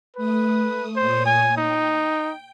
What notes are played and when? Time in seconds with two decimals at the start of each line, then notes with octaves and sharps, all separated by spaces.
0.17 A3 B4 D#6
0.96 A#2 C5 C#5 D#6
1.26 G#5
1.57 D#4 G5